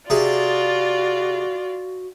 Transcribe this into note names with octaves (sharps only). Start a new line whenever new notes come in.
C3 F4 F#4 G#4 D5